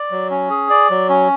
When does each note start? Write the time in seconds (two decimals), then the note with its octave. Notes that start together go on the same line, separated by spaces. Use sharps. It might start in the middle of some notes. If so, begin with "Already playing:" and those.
Already playing: D5
0.11 F#3
0.30 C#4
0.50 G#4
0.70 D5
0.90 F#3
1.09 C#4